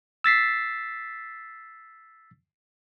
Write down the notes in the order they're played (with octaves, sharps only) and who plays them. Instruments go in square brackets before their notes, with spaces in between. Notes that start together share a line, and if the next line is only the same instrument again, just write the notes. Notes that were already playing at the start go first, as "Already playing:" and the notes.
[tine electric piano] E6 A6 B6 C7